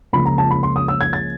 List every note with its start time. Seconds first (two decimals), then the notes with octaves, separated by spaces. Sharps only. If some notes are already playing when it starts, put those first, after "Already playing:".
0.13 C#2 C#3 F3 A#3 C#4 B5
0.26 A#5
0.38 A5
0.51 B5
0.63 C6
0.76 D#6
0.88 E6
1.01 G#6
1.13 A6